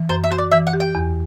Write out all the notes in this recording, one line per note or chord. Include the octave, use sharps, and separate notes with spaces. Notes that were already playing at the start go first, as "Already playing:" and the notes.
Already playing: E3
F#2 C5
E5
F#4 C5
D5
E3 E5
F#5
G4
G5
E2